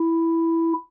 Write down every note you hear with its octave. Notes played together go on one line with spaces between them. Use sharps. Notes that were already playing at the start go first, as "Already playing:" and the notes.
Already playing: E4